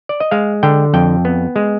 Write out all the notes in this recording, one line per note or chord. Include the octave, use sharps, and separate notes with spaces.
D5
D#5
G#3 F5
D3 G5
F2 G5
B3
G#3